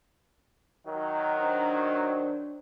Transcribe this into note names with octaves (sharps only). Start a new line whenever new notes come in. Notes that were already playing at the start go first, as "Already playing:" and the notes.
D#3 F#3
D4 C5